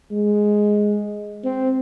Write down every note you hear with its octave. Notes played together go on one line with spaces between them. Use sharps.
G#3
C4